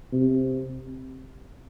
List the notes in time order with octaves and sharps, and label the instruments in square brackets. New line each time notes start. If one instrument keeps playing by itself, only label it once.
[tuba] C3